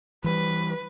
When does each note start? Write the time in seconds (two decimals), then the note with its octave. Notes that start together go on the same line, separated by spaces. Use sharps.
0.24 E3 F#3 G3 B4